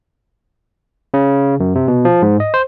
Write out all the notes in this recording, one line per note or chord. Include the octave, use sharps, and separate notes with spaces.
C#3
F#2
C3
B2
F3
G#2
D#5
C5